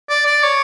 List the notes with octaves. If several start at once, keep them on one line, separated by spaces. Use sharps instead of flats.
D5
D5
C#5